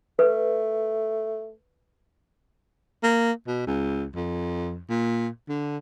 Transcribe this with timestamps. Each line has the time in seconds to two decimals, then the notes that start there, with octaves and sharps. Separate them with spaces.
0.19 A3 B4
3.03 A#3
3.48 B2
3.67 C#2
4.15 F2
4.89 A#2
5.48 D3